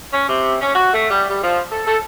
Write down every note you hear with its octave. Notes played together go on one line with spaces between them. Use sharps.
C#4
C3
C#4
F#4
A3
G3
G3
F3
A4
A4